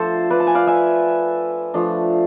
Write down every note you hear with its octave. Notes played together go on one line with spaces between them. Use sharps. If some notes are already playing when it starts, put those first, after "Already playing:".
Already playing: F3 A3 D4 A4 C5
B4 D5
A5
G#5
D5 F5
E5 G#5
F3 A3 D4